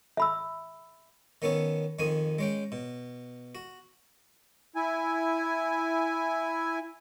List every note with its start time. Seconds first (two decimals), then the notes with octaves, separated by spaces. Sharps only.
0.17 E5 B5 E6
1.42 D#3 B3 C#4 A4 C#5
1.99 F2 D#3 G#5 C#6 D#6
2.39 G#3 C#4 G5
2.72 B2
3.55 F#4
4.76 E4 G#5